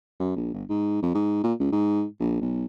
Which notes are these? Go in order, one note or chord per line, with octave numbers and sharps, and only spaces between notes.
F#2
A#1
G1
G#2
F2
G#2
A#2
C#2
G#2
A#1
B1